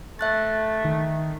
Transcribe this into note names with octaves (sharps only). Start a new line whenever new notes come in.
A3 E5 F#6 A6
D#3